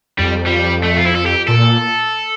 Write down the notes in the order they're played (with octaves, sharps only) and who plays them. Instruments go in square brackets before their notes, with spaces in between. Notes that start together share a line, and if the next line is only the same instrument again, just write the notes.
[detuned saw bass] F2 [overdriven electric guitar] G3
[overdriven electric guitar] G3
A3
F4
E4
A4
G4
[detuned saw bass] A#2 [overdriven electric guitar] A4